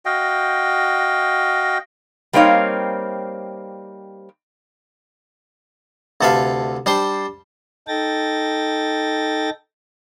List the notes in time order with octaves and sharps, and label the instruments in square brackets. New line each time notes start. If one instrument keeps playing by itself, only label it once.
[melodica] F#4 D#5 F5 G5
[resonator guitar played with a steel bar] G3 A#3 C4 D#4 C#5 F5
[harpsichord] D2 C3 A4 B4 E5 F5
G3 D4 C5 G5 C6
[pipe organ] D#4 A4 G5 A6 A#6